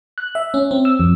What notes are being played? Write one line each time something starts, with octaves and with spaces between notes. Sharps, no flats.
F#6
E5
C#4
C4
E6
F2